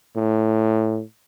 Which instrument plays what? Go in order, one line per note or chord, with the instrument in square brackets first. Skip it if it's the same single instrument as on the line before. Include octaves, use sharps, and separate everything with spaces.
[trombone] A2